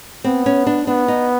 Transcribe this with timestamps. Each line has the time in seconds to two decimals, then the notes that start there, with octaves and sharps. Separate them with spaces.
0.24 B3 C4
0.46 C#4
0.67 D4
0.87 B3 D4
1.08 D#4